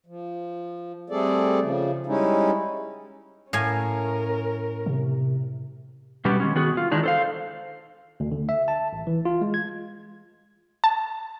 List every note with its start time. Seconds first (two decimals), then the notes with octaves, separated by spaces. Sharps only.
0.06 F3
1.10 G3 A3 C4 G#4 A4 D5
1.61 C#3 F3
2.07 G3 G#3 C#4 D#4 E4
3.53 A2 C#4 A#4 F5 G#5
4.86 C3
6.25 B2 G3 B3 C#4 G4
6.40 D#3 G#3 C#4
6.55 D#3 B3 F#4 G#4
6.77 F4
6.92 D#3 E3 G#3 D4 D#4
7.03 A4 C5 F5
8.20 D2
8.32 D3
8.49 E5
8.68 A5
8.93 A1
9.07 E3
9.25 F4
9.41 G#3
9.54 G#6
10.84 A5